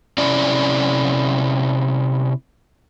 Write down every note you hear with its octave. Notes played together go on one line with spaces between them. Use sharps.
C3 C#4 E4 D5